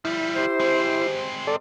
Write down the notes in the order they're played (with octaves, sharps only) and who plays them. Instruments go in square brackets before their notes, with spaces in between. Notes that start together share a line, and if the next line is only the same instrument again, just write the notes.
[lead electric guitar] F3 G3 [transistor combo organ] E4
[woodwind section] G4 C5
[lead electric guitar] G#3 C4
[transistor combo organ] A4 D5